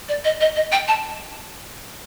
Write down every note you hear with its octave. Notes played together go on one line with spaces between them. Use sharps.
D5
D#5
D#5
D#5
G5
A5